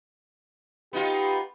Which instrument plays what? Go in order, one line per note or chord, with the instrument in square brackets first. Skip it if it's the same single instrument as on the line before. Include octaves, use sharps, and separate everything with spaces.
[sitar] B3 D#4 F4 [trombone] G4